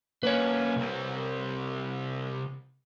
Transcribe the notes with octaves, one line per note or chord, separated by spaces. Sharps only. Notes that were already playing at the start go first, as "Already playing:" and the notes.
A#3 C#4 B4 C#5
C2 C4